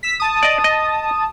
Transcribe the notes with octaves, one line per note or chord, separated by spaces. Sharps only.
E6 B6
A5 D#6
D5 D#5
D#5